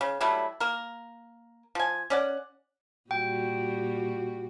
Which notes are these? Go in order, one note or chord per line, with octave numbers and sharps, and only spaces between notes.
C#3
F#3 G3 A3 E4
A#3 A#4
F3 G#5
C#4 D5 F#5
A#2 G3 F#4 G5